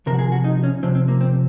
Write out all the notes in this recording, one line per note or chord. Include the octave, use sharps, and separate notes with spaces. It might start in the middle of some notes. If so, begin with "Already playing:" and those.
C#2 C3 F3 A#4
F#4
G#4
F#4
D#4
C#4
C#2 C3 F3 C4
C4
A#3
C4